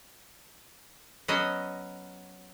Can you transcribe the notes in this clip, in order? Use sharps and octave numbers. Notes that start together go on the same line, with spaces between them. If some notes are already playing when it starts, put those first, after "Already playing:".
F#3 B3 C#4 D#5